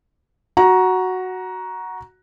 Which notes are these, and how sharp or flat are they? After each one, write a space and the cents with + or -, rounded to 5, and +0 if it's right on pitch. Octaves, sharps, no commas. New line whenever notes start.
F#4 +0 A#5 +15